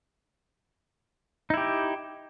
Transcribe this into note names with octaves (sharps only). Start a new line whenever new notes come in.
D#4 E4 G4